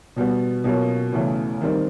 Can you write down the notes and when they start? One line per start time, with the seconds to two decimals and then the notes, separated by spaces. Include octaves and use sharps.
0.16 B2 G3 B3
0.64 B2 F#3 A#3 C#4 F4
1.13 E2 C#3 E3 A3
1.61 D#3 G3 C4 D#4